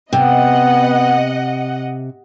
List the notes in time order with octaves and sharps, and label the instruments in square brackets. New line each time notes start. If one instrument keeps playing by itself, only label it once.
[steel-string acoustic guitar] C3 [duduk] B3 [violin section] D#5 F#5